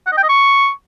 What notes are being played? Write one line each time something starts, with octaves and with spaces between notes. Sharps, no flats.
F#5
D#5
G5
D#5
C#6